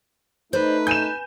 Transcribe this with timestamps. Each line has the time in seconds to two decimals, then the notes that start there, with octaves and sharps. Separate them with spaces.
0.53 A3 D#4 B4 C5 D5
0.87 G#5 G6 D#7 E7